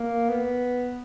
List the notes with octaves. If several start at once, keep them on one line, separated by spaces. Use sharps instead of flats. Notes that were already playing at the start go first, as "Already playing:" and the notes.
Already playing: A#3
B3